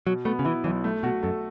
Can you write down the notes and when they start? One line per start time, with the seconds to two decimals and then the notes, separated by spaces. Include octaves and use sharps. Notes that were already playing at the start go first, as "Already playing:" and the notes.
0.06 B2 F#3
0.25 A3 B3
0.39 C#3
0.44 E3 E4
0.64 B1 E3
0.84 A3
1.03 B2 F#4
1.23 F#2 A4